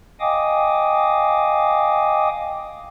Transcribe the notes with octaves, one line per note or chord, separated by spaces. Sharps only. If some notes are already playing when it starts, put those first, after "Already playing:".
D#5 F5 G5 G#5 D6 D#6